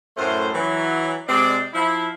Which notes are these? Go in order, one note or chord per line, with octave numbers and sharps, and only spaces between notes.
F#2 A2 A3 C5
E3 F#3
C3 G#3 C4 D5
F3 E4